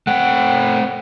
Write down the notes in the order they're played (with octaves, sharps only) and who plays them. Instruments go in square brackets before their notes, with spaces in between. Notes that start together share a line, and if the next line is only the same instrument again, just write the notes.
[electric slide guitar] A3 G5 [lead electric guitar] C4 F#5